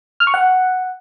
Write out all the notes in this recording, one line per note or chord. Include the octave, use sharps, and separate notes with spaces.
F6
C#6
F#5